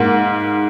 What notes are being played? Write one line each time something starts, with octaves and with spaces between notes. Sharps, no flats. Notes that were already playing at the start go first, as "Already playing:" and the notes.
Already playing: G#2 A#3